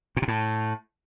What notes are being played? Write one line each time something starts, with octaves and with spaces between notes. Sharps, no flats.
A#2
C3
A2